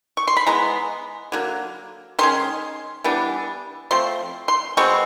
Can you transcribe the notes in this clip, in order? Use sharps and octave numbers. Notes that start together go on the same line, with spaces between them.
C#6
C6
B5
E3 G#3 B3 A#5
D3 F#3 A#3
D#3 G#3 C#4 C6
E3 G3 B3 D4
F3 A3 C4 C6
C6
B2 G#3 C4 C#6